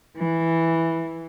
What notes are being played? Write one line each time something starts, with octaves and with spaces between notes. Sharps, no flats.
E3